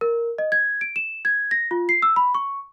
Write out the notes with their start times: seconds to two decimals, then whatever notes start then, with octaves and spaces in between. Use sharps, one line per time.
0.01 A#4
0.38 D#5
0.52 G#6
0.81 D7
0.96 E7
1.25 G#6
1.51 A#6
1.71 F4
1.89 C7
2.02 E6
2.16 B5
2.35 C#6